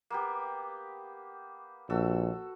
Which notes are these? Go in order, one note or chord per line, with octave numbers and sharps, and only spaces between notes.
A#3 B3 G4
A#1 F#4 A4 E6